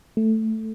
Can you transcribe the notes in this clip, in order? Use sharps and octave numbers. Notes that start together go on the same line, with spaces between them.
A3